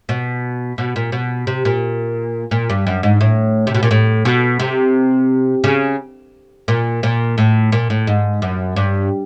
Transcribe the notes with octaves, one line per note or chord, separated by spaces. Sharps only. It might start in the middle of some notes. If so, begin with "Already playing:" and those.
B2
B2
A#2
B2
C3
A#2
A#2
G2
F#2
G#2
A2
C3
B2
A#2
A2
B2
C3
C#3
A#2
A#2
A2
A#2
A2
G#2
F#2
G2